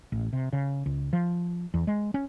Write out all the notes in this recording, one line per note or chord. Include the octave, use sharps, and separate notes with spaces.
A1
C3
C#3
C#2
F3
E2
G#3
C#4